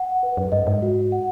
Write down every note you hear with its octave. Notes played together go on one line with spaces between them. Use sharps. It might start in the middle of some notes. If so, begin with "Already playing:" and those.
Already playing: F#5
B4
F#2
G2 D#5
G#2
F#4
F#5